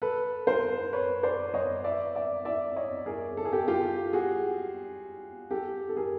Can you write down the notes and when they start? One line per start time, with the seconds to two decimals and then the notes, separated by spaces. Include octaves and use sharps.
0.02 A4 B4
0.47 A#4 C5
0.93 B4 C#5
1.23 C5 D5
1.54 C#5 D#5
1.84 D5 E5
2.15 D5 E5
2.45 D5 E5
2.76 C#5 D#5
3.06 G#4 A#4
3.37 A4
3.45 G#4
3.53 G4 A4
3.68 F4 G4
4.13 F#4 G#4
5.51 G4 A4
5.89 A4
5.97 G#4 A#4